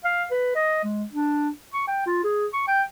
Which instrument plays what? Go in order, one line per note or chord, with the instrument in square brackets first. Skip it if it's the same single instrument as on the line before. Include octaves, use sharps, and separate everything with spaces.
[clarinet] F5
B4
D#5
G#3
D4
C#6
G5
F4
G#4
C#6
G5